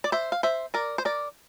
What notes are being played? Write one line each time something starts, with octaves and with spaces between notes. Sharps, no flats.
D5
C5 E5
F5
C5 E5
A#4 D5
C5
A#4 D5